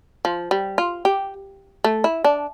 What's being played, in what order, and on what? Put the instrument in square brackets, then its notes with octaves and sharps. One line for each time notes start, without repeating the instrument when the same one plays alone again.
[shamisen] F3
G3
F4
G4
A3
E4
D4